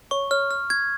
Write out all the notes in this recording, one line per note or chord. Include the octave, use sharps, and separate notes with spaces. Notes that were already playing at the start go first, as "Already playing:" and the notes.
C#5 C#6
C#5 F6
F6
G#6